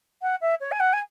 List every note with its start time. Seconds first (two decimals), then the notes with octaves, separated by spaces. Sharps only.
0.22 F#5
0.41 E5
0.60 C#5
0.71 G#5
0.80 F#5
0.93 G#5